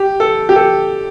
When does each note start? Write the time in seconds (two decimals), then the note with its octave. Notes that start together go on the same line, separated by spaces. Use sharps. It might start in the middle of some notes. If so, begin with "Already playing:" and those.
Already playing: G4
0.20 A4
0.49 G4
0.56 A4